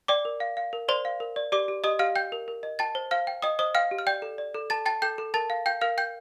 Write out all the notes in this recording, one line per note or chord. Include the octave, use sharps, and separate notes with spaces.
D5 G5 D6
A#4
F5
F5
A#4
C5 D5 C6
F5
A#4
D5
G4 D5 D6
G4
G4 D#5 D#6
G4 F5 F6
G5 G6
A#4
A#4
D#5
G5 A5 A6
C5
C5 F5 F6
G5
D#5 G5 D#6
C5 D#5 D#6
F5 G5 F6
G4
F6
D5 G5 G6
A4
D5
A4
A4 A5 A6
G5 A5 A6
A4 G5 G6
A4
A#4 A5 A6
F5
F5 G5 G6
A#4 F5 F6
G5 G6